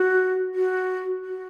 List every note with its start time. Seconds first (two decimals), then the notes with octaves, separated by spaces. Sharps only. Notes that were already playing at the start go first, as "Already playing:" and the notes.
Already playing: F#4
0.54 F#4
1.24 F#4